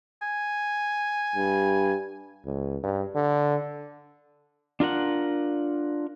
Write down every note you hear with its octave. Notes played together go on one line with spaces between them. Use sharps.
G#5
G2
C#2
G2
D3
D4 F4 A#4 F#5